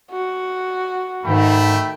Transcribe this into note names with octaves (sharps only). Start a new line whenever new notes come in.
F#4
G#2 D#3 A3 G5 B5